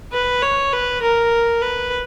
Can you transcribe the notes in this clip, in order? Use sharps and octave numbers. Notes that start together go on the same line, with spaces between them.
B4
C#5
B4
A#4
B4